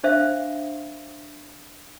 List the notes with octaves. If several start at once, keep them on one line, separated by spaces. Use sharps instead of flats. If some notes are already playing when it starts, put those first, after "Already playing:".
D4 C5 E5 F5